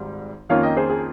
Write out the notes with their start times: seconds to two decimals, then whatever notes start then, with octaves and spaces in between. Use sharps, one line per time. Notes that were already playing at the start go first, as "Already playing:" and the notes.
Already playing: G#1 G#2 G3
0.49 F2 D#3 A#3 C#4 F4 C#5 F5
0.63 D#5 G5
0.77 G#4 C5
0.90 G#4